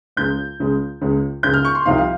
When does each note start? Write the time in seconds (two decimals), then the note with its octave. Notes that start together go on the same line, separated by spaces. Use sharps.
0.17 C#2 C#3 G#3 G6
0.60 C#2 C#3 G#3
1.01 C#2 C#3 G#3
1.43 C#2 C#3 G#3 G6
1.54 F6
1.65 C#6
1.75 C6
1.86 C2 C3 F3 C4 D#4 F5
1.98 F5